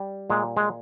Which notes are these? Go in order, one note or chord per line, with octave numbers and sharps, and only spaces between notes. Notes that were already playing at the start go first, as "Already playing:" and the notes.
Already playing: G3
A#2 G#3
G#3